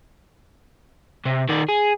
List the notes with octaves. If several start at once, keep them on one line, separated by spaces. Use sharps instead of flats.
C3
D#3 D5
G#4